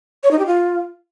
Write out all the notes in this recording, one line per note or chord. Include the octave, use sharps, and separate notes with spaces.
C#5
D#4
G4
F4